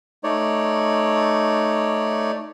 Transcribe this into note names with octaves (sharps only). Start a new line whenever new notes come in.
A3 D#4 C#5 D5